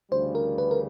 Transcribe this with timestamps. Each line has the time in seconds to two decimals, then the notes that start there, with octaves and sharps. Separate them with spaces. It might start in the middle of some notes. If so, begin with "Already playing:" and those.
0.12 D2 C#3 E3 G3 C5
0.35 A#4
0.58 B4
0.71 A#4